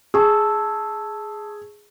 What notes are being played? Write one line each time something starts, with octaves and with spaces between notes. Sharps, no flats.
G#4 A5 C#6 E6